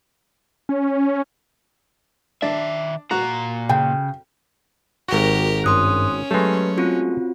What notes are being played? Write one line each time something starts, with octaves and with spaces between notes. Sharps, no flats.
C#4
D#3 D4 E5
A#2 F#4 A#5
C#3 G5
G#1 F#4 G4 A#4
G2 C#4 C6 D#6 F#6
F#3 G#3 A3 G4 B4
C4 F4 F#4